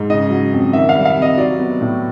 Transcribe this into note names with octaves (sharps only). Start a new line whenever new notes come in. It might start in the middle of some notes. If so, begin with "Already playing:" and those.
Already playing: G#2
C#3 D#5
F#3
F2
D#3 E5
F5
G3
F5
C3
D#5
F#3 D5
B3
A2